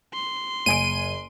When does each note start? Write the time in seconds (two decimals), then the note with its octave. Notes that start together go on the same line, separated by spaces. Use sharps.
0.14 C6
0.66 F#1 G#5 D7 D#7